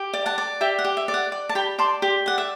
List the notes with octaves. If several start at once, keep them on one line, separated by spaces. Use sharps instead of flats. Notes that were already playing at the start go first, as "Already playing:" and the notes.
Already playing: G4
D5
F#5 A5
D5
G4 E5 G5
F#5
G4
E5
D5
F#5
D5
A5
G4 G5 B5
D5 A5 C6
G4
D5 F#5
E5